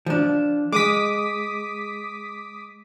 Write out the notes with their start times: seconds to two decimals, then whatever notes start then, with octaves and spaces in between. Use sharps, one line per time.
0.06 F3 D4
0.72 G#3 D6 D#6 B6